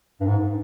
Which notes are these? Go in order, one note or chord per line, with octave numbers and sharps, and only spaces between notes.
G2
G#2